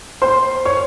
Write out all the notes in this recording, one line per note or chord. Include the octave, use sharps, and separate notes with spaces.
C5 C6
C#5 C#6